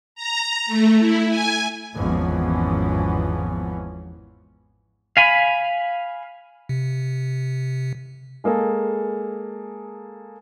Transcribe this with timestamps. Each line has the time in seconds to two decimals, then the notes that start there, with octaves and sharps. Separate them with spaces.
0.15 A#5
0.66 A3
0.98 E4
1.29 G#5
1.94 G#1 E2 E3 F3 B3 C#4
5.17 F5 G#5 B5
6.69 C3
8.44 G#3 A#3 G#4 A4